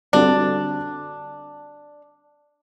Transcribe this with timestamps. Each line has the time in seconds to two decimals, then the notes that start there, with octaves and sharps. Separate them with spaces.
0.13 D3 G3 C4 D4 F#4 A4